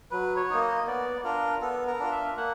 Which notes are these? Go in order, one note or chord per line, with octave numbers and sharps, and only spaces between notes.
F#3 B4
C#5
A#3 D#4
D#5
B3 D5
D4 F4 A#4
B3 A4
A#4
D4 F4
E5
A#3 F#5